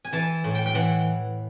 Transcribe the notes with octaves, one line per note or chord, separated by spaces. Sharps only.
G#5
E3 A5
A2
G5
G5
E3 F#5